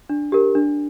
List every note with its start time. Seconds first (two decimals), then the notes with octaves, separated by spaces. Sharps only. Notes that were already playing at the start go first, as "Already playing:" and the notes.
0.10 D4
0.32 G4 A#4
0.55 D4